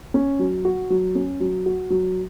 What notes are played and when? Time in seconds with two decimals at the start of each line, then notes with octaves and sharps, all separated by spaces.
0.14 C#4
0.39 F#3
0.65 F#4
0.90 F#3
1.15 C#4
1.40 F#3
1.66 F#4
1.90 F#3